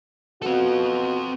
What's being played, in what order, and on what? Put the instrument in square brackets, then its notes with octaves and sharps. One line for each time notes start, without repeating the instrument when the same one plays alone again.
[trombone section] B2 F#4 [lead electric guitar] C4 A4